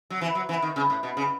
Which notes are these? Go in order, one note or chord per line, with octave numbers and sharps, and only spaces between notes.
F#3
E3
F#3
E3
D#3
C#3
A2
B2
C#3